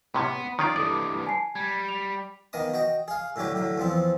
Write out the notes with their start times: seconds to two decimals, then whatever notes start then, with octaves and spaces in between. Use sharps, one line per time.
0.14 A2 C3 B3 C#4
0.59 D#3 C#4 F4 D5
0.76 G2 E3 A4 D5 D6 D#6
1.27 G#5 A5 C7
1.55 G3 G#6
1.89 F7
2.53 D#3 A#3 B3 D#5 D#6
2.74 F#4 D#5 G5
3.08 G#4 F5
3.36 A2 D3 F#3 G4 C#5
3.55 A2 D3 F#3
3.78 E2 F3 C4